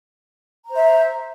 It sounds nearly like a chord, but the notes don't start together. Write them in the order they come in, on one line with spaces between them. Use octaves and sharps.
A#5 C5 E5